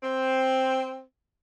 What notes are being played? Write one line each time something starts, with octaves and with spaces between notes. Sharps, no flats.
C4